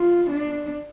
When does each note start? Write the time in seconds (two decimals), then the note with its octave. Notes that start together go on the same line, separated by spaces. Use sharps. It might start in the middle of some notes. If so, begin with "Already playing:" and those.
Already playing: F4
0.31 D4